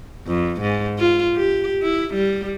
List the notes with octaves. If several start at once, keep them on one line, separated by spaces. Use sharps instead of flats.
F2
G#2
F4
G4
E4
G3